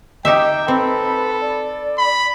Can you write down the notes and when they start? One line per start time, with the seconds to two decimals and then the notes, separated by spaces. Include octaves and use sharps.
0.25 D#4 G4 E5 G5
0.68 C4 A4 B4 B5
1.40 D5
1.98 B5